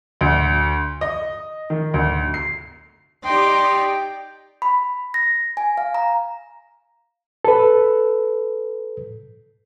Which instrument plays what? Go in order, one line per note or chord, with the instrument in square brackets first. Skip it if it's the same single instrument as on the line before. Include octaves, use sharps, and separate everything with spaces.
[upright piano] D2
D#5
D#3
D2
C7
[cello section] D#4 G4 D5 [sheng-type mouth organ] G5 [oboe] C6
[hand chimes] B5
A#6
G#5
F5
A#5
[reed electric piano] A4 B4